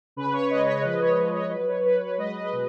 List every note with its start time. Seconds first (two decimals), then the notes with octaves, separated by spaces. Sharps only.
0.16 C#3 B4
0.33 C#5
0.50 G#3 B4 D#5
0.66 C#5
0.84 F3 B4 D#5
1.01 C#5
1.18 F3 B4
1.34 C#5
1.50 F#3 B4
1.68 C#5
1.85 F#3 B4
2.02 B4
2.18 G#3 B4 D#5
2.41 B4 D#5
2.52 B2